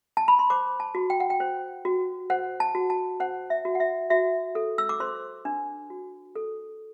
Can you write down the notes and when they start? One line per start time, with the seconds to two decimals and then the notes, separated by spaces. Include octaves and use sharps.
0.17 A5
0.28 B5
0.39 C6
0.50 C5 D6
0.80 A5
0.95 F#4
1.10 G5
1.20 F#5
1.30 G5
1.40 C5
1.85 F#4
2.30 C5 F#5
2.60 A5
2.75 F#4
2.90 A5
3.20 C5 F#5
3.50 E5
3.65 F#4
3.75 F#5
3.80 E5
4.10 F#4 E5
4.55 A4
4.78 E6
4.89 D6
5.00 C5 C6
5.45 D4
5.90 F#4
6.35 A4